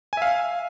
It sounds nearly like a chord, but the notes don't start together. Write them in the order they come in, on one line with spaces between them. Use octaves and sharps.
G#5 E5 F5